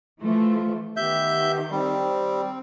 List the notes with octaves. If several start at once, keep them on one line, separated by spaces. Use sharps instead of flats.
E3 F3 A3 F4
D#3 B3 G4 E5 G6
G3 C4